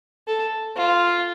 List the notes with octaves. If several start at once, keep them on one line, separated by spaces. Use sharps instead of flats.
A4
F4